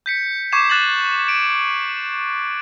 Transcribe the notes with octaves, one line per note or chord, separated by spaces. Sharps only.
G6 B6 C#7
C#6 D6 G#6 C7 E7
F#6 A6 E7 F#7
D7